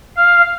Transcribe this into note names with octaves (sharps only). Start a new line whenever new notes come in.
F5